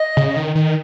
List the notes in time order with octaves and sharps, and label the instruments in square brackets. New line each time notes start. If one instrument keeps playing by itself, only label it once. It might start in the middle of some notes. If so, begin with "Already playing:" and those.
Already playing: [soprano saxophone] D#5
[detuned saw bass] C#3
D#3
D#3